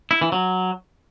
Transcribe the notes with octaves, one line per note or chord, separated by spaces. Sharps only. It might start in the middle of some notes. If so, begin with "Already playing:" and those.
E4
E3
F#3